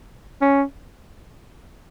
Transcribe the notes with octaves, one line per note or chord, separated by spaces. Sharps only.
C#4